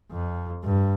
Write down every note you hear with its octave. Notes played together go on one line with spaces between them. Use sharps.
F2
G2